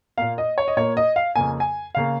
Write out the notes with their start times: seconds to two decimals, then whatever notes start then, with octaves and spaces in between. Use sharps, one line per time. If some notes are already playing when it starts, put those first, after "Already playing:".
0.18 A#2 A#3 F5
0.38 D#5
0.58 C#5
0.68 D#5
0.77 A#2 A#3 C#5
0.97 D#5
1.16 F5
1.36 F2 C#3 A#3 G#5
1.60 G#5
1.95 C#3 A#3 F5